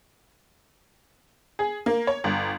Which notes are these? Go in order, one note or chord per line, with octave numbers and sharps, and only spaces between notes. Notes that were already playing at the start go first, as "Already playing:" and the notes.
G#4
A#3
C#5
G1